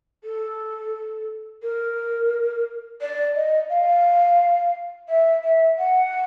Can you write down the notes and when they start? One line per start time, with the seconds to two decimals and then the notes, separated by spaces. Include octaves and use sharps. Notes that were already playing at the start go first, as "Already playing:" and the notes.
0.24 A4
1.63 A#4
3.01 D5
3.36 D#5
3.70 F5
5.09 E5
5.44 E5
5.79 F#5